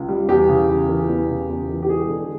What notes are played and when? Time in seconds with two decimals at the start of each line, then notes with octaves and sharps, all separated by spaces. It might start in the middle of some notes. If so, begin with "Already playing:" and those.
Already playing: C#2
0.08 G3
0.29 E2 G4
0.49 C#3
0.69 E2
0.89 E3
1.09 E2
1.29 C#3
1.49 E2
1.70 E3
1.82 G4
1.89 G#3 G#4
2.09 D3